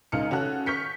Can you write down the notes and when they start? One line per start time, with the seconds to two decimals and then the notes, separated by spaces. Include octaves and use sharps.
0.12 C#2 D#4 F6 C#7
0.30 C#3 C#4 F#4 A4 F#6
0.66 C#6 F6 G6 B6 C#7